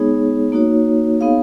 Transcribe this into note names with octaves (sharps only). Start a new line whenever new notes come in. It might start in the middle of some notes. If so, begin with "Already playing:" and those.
Already playing: G#3 B3 D#4 G#4 C#5
A#3 D#4 F#4 C#5
B3 D#4 G#4 C#5 F5